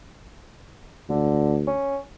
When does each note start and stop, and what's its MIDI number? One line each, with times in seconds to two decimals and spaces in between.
1.09 1.73 38
1.09 1.55 50
1.67 1.98 61